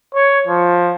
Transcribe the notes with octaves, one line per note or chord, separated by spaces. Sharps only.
C#5
F3